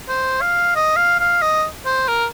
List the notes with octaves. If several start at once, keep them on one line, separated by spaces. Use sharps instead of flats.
C5
F5
D#5
F5
F5
D#5
C5
A#4